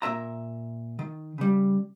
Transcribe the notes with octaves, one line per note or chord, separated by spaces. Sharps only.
A#2 A#4 E5 A#5
D#3
C#3 G3